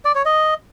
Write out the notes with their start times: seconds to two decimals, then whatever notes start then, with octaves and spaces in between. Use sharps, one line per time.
0.05 D5
0.15 C#5
0.25 D#5